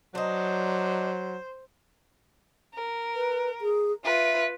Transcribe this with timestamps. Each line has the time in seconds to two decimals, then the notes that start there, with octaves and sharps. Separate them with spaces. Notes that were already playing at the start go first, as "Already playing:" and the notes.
0.15 F#3 D4 D#4 C5
2.75 A#4
3.15 B4
3.61 G#4
4.05 F4 B4 E5